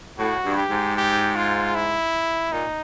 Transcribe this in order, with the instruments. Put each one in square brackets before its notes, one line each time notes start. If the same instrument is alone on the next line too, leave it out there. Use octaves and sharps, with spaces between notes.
[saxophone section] A2 [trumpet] F#4
[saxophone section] G2
[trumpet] G4
[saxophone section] G#2
[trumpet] G4
F4
E4
[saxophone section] A#2 [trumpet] D#4